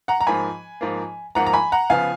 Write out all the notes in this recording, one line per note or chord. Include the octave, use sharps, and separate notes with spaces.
F#5 A#5
A#5
G#2 F3 A#3 G#5 B5
G#2 F3 A#3
G#2 F3 A#3 F#5 A#5
A#5
G#5 B5
F#5 A#5
C#3 F3 B3 F5 G#5